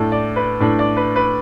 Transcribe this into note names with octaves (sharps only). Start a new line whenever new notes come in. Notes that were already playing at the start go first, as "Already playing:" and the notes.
Already playing: A2 A3 D4
D5
B4
A2 A3 D4
D5
B4
B4